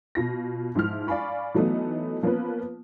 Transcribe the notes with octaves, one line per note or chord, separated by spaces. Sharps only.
B2 F4 A#6
G#2 F3 E4 F4 F6
D5 F5 G#5 B5 C#6
E3 F#3 A3 B3 D#4
F3 A#3 B3 C#4 F4 B4